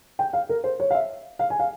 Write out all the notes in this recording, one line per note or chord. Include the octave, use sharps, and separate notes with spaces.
G5
F5
A#4
C5
C#5
F5
E5
F5
G#5
F5